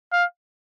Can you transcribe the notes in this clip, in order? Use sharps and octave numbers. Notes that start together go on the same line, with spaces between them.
F5